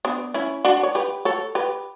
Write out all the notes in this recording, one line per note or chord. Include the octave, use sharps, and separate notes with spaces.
B3 D4
C#4 E4
D4 F#4
C#5
G4 B4
A4 C#5
G4 B4